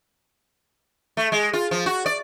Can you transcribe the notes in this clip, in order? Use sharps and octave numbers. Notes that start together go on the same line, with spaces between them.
A3
G#3
F4
F3
F#4
D5